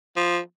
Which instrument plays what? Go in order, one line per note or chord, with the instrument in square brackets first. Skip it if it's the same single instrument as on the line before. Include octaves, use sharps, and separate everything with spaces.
[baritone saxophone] F3